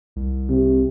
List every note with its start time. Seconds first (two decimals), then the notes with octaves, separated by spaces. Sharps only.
0.16 C2
0.49 C3